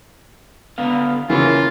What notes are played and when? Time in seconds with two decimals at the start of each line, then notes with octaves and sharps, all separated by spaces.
0.78 D3 B3 F5
1.30 C#3 E3 A#3 C#4 F4 A#4